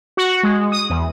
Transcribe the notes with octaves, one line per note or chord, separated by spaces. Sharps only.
F#4
G#3
D#6
E2